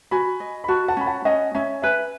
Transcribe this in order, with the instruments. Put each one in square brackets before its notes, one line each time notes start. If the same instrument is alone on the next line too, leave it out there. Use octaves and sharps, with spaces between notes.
[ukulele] F#4 [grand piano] G#5 B5
[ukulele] D#5
[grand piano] B5
[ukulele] F#4 [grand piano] A5 C#6
[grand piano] F#5 A5
[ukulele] C#4 [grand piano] B5
[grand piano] F#5 A5
[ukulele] C#4 [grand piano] D#5 F#5
[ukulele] C#4 [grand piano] E5 G#5
[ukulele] B4 [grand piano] E5 G#5